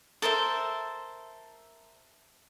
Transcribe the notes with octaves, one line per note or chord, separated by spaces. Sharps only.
A4 A#4 C5 E5